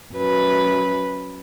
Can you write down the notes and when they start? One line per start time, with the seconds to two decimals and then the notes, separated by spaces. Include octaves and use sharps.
0.15 F#2 B4